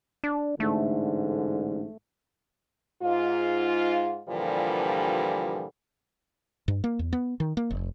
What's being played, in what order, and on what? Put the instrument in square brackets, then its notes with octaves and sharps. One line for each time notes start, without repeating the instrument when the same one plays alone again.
[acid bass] D4
[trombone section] A1 G#2 D3 [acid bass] A3
[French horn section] G#2 F4
G2 A#2 D3 E3 F3 G3
[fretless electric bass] G2
A#3
E2
B3
D#3
A#3
F1